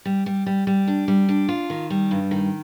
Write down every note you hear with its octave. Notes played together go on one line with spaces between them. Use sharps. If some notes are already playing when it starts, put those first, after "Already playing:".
G3
G3
G3
G3
D4
G3
D4
F4
D#3
G3
G2
D#3